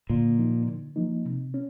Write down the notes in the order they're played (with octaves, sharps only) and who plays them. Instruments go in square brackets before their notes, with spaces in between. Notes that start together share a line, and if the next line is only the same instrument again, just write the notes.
[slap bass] A#2 [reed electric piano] D3
[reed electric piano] F3 A#3 D#4
D3
F3 A#3 D#4
C3
C#4